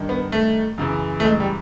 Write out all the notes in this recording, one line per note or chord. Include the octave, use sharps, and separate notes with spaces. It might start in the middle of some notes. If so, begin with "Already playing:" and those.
Already playing: G2 D#3
B3
A3
F#2 C#3 E3
A3
G#3
G3